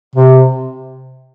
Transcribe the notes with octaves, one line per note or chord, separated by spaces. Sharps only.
C3